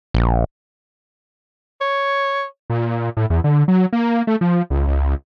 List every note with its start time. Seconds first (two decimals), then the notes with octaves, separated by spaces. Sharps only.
0.14 A#1
1.81 C#5
2.70 A#2
3.17 A2
3.30 E2
3.44 D3
3.68 F#3
3.93 A#3
4.27 A3
4.41 F3
4.70 C#2
4.87 C#2